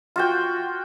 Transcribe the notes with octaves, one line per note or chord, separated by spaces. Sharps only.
F4 F#4 G5